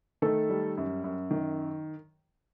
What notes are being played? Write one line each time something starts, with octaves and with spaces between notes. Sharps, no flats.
D#3 A3 A4
G3
F#2
F#2
D#3